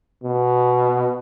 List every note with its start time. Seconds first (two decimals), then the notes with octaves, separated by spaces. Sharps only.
0.23 B2